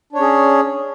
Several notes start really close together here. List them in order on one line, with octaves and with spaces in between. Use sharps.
D4 C#5 C#4 G#4